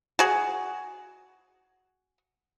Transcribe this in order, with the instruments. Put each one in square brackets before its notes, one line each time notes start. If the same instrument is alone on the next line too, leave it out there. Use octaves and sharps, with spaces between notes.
[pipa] F#4 G#4